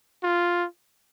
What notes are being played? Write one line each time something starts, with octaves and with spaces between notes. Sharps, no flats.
F4